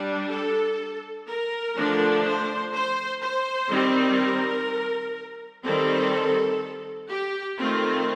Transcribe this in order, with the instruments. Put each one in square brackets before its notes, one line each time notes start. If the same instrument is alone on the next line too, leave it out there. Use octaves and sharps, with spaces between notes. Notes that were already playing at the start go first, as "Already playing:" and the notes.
Already playing: [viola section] G3 D4
A4
A#4
D3 F3 A3 D4
C5
C5
C5
D#3 G3 C4
A#4
D#3 G3 C4 A4
G4
D#3 A3 C4 F4